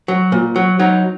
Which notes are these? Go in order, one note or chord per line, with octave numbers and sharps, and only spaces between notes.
F#3
A#2
F#3
F#3 D#4